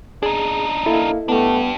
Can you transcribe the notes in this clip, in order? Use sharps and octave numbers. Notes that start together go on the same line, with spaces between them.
D4 D#4 G#4
A#3 E4 A4 D#5
A3 B3 D4 G4